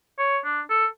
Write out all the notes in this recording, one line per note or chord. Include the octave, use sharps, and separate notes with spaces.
C#5
D4
A4